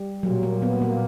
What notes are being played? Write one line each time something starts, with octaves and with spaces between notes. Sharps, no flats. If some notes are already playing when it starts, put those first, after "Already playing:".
Already playing: G3
A#2 F#3
A#3
B3
A#3